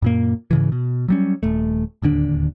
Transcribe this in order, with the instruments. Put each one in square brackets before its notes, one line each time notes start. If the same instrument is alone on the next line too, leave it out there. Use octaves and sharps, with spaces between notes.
[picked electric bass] F#2 A#2 A#3
G#2 C#3 E3
B2
F#3 G3 C#4
D#1 A3
D1 D#2 D3 D4